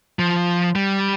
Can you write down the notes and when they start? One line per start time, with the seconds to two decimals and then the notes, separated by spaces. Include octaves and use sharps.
0.19 F3
0.76 G3